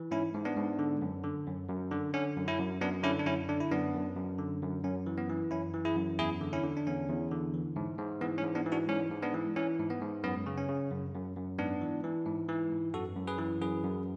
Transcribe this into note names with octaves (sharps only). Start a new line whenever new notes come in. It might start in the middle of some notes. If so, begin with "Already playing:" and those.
Already playing: E3
G#2 C#4 E4
G#2
B3 D4
G#2
D3
F#2
D3
F#2
F#2
D3
D3 C#4
F#2
C#4 E4
F#2
F#2 B3 D4
D3 C#4 E4
D4
F#2 C#4 E4
D3 D4
E4
F#2 B3 D4
F#2
F#2
D3
F#2
F#2 C#4
E3
B3
E3
F#2 C#4 E4
E3
E4 G#4
F#2
E2 E4 G#4
D3
C#4 E4
D3
D4
E2 C#4
E2
D3
E3
G#2
G#2
E3 B3
C#4
G#2
B3 D4
E3
D4 F#4
G#2 C#4
G#2
B3 D4
E3
E3 C#4
G#2
B3
G#2
F#2 B3
C#3
C#4
C#3
F#2
F#2
F#2
G#2 B3 D4
E3
E3
G#2
E3
G#2
F#2 F#4 A4
F#2
G#4 B4
E3
F#2 G#4 B4
F#2